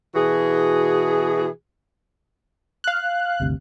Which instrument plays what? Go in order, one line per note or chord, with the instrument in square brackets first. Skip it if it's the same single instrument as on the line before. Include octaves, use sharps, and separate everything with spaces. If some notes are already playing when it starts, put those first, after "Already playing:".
[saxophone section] B2 E3 F#4 G#4
[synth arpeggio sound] F5 F#6
[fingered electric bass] G1 D2 C3